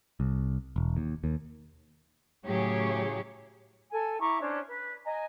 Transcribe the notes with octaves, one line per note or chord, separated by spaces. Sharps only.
C2
E1
D#2
D#2
A2 C#3 F#3 G4 G#4 C#5
A4 G#5
E4 A#5 C#6 D6
C#4 D4 C5 C#5
B4
D#5 G#5 A#5